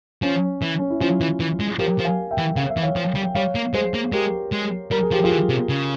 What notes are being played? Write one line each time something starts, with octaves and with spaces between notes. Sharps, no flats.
F3 C#4
E3
C#4
E4
F3 C#4 F4
E3
E3
G#3
F3 G4 A#4
F3
F5 G#5
E5 G5
E3
C#3 F5
E5
E3
C#5 F5
F3
G3
G5
G3 C#5 F5
A#3
G#3 G#4 C5
A#3
G#3 G4 A#4
G#3
G3 A#4
G#4
F3 G4
F3 F4 G#4
E3
C3
C#3